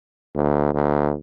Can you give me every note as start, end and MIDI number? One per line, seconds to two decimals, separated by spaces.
0.35 0.71 38
0.74 1.14 38